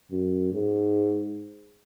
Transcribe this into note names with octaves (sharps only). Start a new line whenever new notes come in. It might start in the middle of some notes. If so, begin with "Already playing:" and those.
F#2
G#2